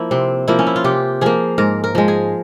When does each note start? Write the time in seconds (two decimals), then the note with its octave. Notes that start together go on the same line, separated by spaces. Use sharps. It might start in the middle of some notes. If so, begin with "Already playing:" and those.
Already playing: F3 A#3 E4
0.11 C3 C4
0.48 F3 A#3 E4
0.59 C#4
0.67 E4
0.76 F4
0.84 C3 G4
1.21 F3 A#3 G#4
1.58 G#2 A#4
1.84 A#4
1.95 F3 G#3
2.08 G#4